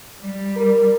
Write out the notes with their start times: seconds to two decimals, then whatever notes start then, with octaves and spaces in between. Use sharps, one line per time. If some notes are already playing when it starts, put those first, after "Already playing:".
0.21 G3
0.56 A#4